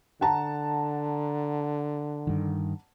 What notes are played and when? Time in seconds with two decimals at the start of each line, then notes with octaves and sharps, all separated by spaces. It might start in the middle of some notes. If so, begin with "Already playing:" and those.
0.21 D3 F#5 A5 A#5
2.27 G2 D#3